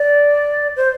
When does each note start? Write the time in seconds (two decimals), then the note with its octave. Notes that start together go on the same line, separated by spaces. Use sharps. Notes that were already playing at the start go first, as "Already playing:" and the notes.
Already playing: D5
0.77 C5